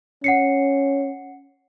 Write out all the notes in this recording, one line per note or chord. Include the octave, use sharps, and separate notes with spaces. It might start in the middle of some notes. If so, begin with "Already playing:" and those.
C#4 F#5 C7 C#7